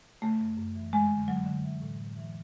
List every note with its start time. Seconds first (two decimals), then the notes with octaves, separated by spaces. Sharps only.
0.22 C#3 A3
0.40 F#2
0.57 F#2
0.75 E3
0.93 F2 G#3
1.11 D3
1.28 D3 F#3
1.46 D3
1.64 E3
1.82 A2
1.99 A2
2.17 E3